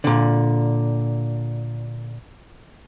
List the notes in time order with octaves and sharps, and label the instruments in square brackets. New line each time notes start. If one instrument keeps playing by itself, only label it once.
[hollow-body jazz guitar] A#2 D3